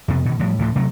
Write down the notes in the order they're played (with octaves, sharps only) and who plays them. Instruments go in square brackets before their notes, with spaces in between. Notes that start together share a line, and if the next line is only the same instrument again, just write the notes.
[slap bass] F2 C3 B3
B2 D#3
A2 F3 G3
D2 A2 F3
C3 F#3 A3